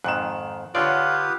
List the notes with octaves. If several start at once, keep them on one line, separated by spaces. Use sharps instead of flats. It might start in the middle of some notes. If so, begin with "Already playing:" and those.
F2 G#2 D#3 F#6 E7
D3 F4 G4 B4 C#5 D5 F#5 D#6